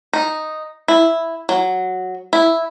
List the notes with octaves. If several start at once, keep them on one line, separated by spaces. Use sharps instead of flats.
D#4
E4
F#3
E4